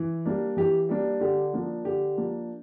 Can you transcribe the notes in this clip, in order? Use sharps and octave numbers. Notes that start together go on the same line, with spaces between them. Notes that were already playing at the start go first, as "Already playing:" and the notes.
Already playing: E3
G3 A#3 D4
E3 G4
G3 A#3 D4
D3 G4
F3 A#3 D4
D3 G4
F3 A#3 D4